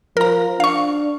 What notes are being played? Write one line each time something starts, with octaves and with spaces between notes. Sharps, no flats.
F3 A#4 A#5
D4 F5 C#6